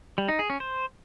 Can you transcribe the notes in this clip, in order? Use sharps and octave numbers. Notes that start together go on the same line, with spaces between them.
G3
D#4
G#4
C#4
C5